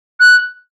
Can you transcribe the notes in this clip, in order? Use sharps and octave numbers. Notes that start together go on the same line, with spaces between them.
F#6